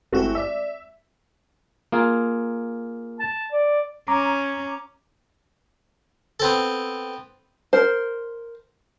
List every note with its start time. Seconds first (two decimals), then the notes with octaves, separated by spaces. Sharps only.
0.12 G1 A3 C4 E4 F#4 G4
0.35 D5 E5 E6
1.92 A#3 F4 G#4
3.20 A5
3.53 D5
4.08 C#4 A#5 D6
6.40 B3 C4 A4
7.73 A#4 C5